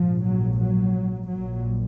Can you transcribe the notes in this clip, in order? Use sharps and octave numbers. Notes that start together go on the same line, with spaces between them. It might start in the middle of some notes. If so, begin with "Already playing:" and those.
Already playing: A#1 G#2 F3
F#3
F#3
A#1 A#2 F#3